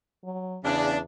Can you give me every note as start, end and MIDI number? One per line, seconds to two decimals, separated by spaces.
0.24 0.59 54
0.64 1.00 40
0.64 0.96 49
0.64 0.96 62